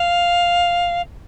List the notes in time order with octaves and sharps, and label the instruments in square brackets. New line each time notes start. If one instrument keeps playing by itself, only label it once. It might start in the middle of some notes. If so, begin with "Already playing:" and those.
Already playing: [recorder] F5